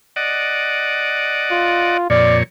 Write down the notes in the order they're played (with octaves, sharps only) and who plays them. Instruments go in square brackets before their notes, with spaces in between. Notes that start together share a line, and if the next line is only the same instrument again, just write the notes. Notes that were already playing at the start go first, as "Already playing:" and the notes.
[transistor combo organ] D5 D#5 F#5
[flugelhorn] F4
[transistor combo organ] F2 A#2 C#5 [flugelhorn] D5